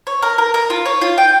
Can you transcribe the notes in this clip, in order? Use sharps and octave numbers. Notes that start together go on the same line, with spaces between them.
C#5
A#4
A#4
A#4
F4
C#5
F4
G5